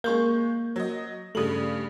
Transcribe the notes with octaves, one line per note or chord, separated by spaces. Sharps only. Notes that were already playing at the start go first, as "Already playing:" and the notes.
G#3 A#3 C#6 G6
F#3 D#5
G2 C#3 A3 D#6 F#7